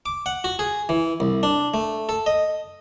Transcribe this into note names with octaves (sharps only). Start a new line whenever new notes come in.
D6
F#5
F#4
G#4
E3
C2
D4
A3
A4
D#5